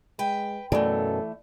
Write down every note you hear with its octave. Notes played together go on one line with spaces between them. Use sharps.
G#3 B4 G5
F#2 B2 E3 A3 A4 D5